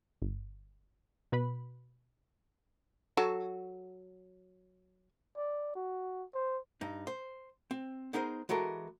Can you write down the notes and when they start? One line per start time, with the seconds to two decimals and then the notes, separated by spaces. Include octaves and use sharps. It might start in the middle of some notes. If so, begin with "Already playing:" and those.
0.22 G1
1.32 B2 B4 B5
3.17 F#3 F#4 A4
5.36 D5
5.75 F#4
6.34 C5
6.81 G2 D#4
7.07 C5
7.71 C4
8.13 B3 D#4 G#4 A#4 C5
8.49 E3 G#3 F#4 A4 A#4